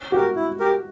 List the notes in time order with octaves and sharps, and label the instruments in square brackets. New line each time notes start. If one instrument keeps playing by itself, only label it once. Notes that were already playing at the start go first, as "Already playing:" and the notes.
[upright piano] F#4 [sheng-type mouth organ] G4 A#4
[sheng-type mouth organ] E4
G4 A#4